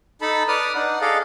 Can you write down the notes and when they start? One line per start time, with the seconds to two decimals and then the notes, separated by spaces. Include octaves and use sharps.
0.21 D#4 A4 A5 B5
0.48 B4 D5 D#6 F6
0.75 D4 D#4 F#5
1.01 G#4 A4 D5 D#5 F5